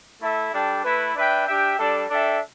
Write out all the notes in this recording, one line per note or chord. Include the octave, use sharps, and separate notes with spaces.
A3 E4 A4 E5
G3 D4 A4 G5
A3 E4 B4
D4 B4 E5 G5
D4 G4 E5 G5
G3 D4 A4 D5
D4 A4 E5 G5